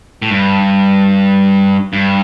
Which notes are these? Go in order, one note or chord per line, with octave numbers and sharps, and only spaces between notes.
A2
G2
G2